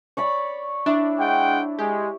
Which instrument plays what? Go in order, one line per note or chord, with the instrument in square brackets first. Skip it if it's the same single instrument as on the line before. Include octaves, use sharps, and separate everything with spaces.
[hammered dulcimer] C#5 D5 B5
[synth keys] D4 [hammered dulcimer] E4
[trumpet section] G#3 F#5 G5
[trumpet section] G#3 [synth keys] G4